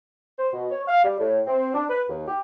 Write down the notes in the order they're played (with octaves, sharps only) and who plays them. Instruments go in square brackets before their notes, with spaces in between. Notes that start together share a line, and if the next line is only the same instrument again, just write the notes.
[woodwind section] C5
B2
C#5
F5
G3
A2
C4
D4
B4
D#2
G4